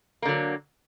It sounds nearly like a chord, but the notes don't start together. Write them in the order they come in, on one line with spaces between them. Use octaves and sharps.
A#3 D3 F#3